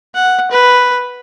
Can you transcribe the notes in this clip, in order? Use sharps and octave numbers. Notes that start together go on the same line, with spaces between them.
F#5
B4